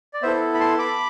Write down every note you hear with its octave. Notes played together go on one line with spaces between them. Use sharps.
D5
B3 E4 A4 C5 E5
B5
A5 C6
B5 D6